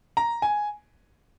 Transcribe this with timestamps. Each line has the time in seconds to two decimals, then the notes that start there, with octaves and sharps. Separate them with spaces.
0.17 A#5
0.42 G#5